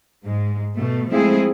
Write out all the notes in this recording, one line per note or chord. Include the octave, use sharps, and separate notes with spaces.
G#2 G#3
B2 A3
F3 G#3 A3 C4 E4 G#4